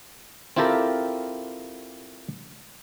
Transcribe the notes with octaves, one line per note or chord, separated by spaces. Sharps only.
C4 E4 F4 G4 A4 A#4